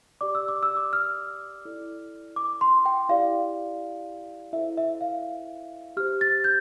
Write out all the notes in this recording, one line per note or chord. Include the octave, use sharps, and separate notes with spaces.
G4 D5 D6
E6
D6
E6
D6
F6
E4 A4 D5
D6
C6
G5
E4 G4 D5 F5
E4 A4 C5 E5
E5
F5
G4 C5 F6
A6
G6